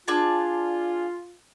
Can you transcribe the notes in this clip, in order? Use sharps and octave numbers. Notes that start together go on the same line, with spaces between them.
D4 F4 G#4 A5